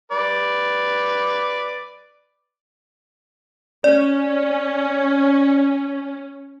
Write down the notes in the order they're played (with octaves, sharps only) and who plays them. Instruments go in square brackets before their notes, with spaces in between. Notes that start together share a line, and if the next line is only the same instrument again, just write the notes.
[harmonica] B4 D5
[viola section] C#4 [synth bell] D5